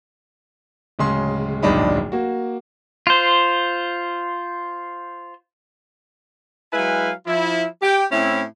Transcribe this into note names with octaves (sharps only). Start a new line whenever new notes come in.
D1 C#3 G#3 C6
D1 A#1 G2 D4 D#4 B5
A#3 F#4
F4 C5
F#3 G#3 E4 B4 F5 G#5
F3 E4
G4 G5
A2 C4 C#4 E4